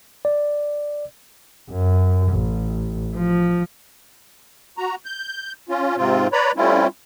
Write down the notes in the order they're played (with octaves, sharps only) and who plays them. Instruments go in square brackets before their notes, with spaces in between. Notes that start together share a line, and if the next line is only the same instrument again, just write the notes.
[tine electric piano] D5
[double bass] F#2
A1
F3
[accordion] F#4 A#5
G6
C#4 F4
G#2 C3 C4 F4
B4 C#5 D5 A#5 B5
G3 A3 C4 C#4 E4 F4